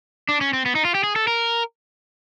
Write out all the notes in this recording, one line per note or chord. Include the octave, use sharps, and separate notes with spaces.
D4
C#4
C4
B3
D#4
F4
G4
G#4
A4
A#4